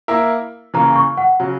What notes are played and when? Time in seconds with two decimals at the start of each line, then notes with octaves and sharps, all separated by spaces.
0.08 A#3 E4 A#4 E5
0.74 C#3 E3 A#3 A#5
0.96 C#6
1.17 F#5
1.40 C#3 F#3